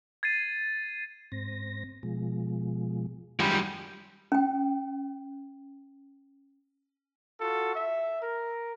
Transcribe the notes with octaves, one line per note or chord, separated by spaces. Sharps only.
G#6 A6 C7 D#7
G#2 C4 A#6
B2 F3 G#3
F#2 D#3 G3 G#3 F4
C#4 G5
F4 F#4 A4
E5
A#4